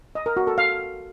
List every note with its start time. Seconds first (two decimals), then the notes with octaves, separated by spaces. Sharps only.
0.15 D#5
0.26 A#4
0.37 F#4
0.47 A4
0.58 F5